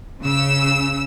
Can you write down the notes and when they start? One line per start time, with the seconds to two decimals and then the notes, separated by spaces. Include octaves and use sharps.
0.21 C#3 E6